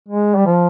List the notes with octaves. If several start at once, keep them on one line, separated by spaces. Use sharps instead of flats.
G#3
G3
F3